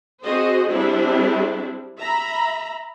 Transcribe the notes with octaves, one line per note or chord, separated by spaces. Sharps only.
C4 F#4 G#4 C5 D#5
G3 C4 D4 E4 G#4
E5 A#5 B5